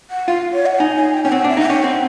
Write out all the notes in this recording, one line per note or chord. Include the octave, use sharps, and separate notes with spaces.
F#5
F4 F5
C#5
F#5
D#4 G#5
G#5
G5
C#4 G5
C4 F#5
D4
E5
D#4 F#5
C#4 G5
C4 F#5